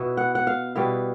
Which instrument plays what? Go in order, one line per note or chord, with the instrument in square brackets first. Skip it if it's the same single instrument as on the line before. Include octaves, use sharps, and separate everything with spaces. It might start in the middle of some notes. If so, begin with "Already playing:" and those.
Already playing: [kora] B2 B3 E4
F#5
F#5
F5
B2 G3 B3 E4 F5